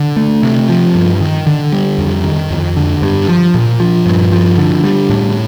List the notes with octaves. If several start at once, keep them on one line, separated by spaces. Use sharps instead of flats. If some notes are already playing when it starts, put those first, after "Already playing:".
Already playing: D3
A3
C3
F3
G2
D#3
D3
G3
F2
D#3
F2
D3
G2
F3
A#2
F3
G2
F3
D3
G3
A2